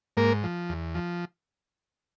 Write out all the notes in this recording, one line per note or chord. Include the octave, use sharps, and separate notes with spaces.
G#2 A#3 A#4
F3
E2
F3